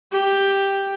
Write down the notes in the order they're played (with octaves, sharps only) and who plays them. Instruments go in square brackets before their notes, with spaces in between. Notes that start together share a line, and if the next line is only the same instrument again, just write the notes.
[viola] G4